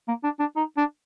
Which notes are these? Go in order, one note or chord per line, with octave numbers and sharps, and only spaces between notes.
A#3
D4
D4
D#4
D4